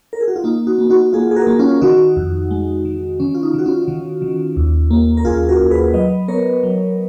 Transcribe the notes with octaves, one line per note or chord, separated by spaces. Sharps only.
A#4
G#4
F#4
F4
A#3 D#4
D#4 F#4
A#3
D#4 F#4
A#3 F4 G#4
G#4
F#4 A#4
A#3
C#4 F4
D#3 D#4 F#4
F2
G#3
D#3
D#3 C#4
F4
D#4
D#3 F#4
C#4 F4
D#3
D#3
D#2
A#3
A#4
D#2 F4 G#4
F#4 A#4
D#2
G#4 B4
F#3 B4 D#5
B3 A#4 C#5
F#3